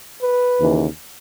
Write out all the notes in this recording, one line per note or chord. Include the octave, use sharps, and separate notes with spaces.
B4
D#2 C#3 E3